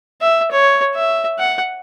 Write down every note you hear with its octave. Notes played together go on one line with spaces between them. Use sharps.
E5
C#5
E5
F#5